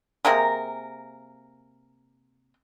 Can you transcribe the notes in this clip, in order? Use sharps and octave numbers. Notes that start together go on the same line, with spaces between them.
C3 A#3 G#4 A#4